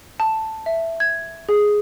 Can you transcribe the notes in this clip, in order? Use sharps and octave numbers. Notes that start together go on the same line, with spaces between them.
A5
E5
G#6
G#4